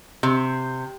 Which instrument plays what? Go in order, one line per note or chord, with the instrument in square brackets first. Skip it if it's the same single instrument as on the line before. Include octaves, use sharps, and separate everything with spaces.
[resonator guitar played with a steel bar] C3